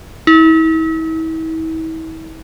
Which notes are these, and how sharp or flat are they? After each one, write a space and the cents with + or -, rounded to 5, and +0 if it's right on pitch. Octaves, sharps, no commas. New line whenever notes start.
E4 -40